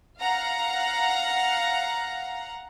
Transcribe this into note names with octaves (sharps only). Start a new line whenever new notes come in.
F5 F#5 A#5